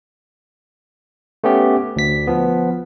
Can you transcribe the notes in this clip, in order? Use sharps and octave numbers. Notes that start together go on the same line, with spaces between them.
A3 B3 C#4 G4
D2 B6
F3 B3